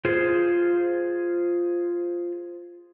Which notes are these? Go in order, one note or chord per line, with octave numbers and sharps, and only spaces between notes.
F4 G#4 C5